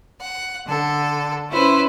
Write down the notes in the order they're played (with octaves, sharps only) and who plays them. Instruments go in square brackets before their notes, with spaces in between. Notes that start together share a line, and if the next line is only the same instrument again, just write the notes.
[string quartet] F#5
D3 A4
C#4 E4 B4 C5